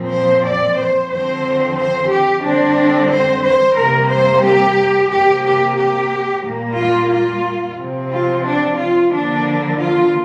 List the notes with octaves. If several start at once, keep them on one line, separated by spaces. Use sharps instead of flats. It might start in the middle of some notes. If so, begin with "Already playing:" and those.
Already playing: A#2 F3 C4
C5
D5
C5
D3 F3 C4 C5
C5
G4
D3 G3 C4 D4
C5
C5
C3 G3 A#3 A#4
C5
G4
C3 A#3 G4
G4
G4
A#2 G3 A#3
F4
F4
C3 F3 C4
F4
D4
F4
D3 F3 A#3 D4
F4